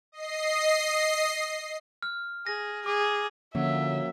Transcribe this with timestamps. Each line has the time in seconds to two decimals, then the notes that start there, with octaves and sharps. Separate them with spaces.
0.12 D#5 C7
2.03 F6
2.47 G#4 A#6
2.86 G#4 D6
3.55 D3 F3 F#3 A#3 C#4 E5